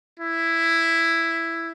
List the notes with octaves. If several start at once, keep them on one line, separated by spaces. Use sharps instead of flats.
E4